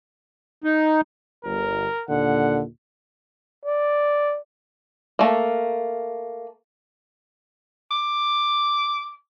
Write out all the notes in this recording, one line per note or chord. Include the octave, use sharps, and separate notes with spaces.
D#4
G1 A#4
D#2 A#2 D3 F#5
D5
A3 A#3
D6